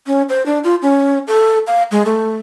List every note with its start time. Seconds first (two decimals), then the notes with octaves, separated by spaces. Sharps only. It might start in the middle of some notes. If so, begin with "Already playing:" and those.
0.07 C#4
0.29 C5
0.46 D4
0.64 F4
0.82 C#4
1.27 A4
1.67 F5
1.91 G#3
2.05 A3